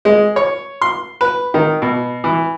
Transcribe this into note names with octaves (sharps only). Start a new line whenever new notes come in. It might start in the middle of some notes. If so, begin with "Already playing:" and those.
G#3
C#5
C6
B4
D#3
B2
E3